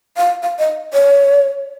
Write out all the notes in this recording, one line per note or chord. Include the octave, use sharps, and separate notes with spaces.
F5
F5
D#5
C#5